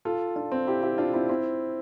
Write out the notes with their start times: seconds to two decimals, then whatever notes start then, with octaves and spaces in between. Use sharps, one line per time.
0.05 F4 A4
0.36 D4 F4
0.52 C4
0.67 E4 G4
0.83 E4 G4
0.98 D4 F4
1.14 C4 E4
1.29 C4 E4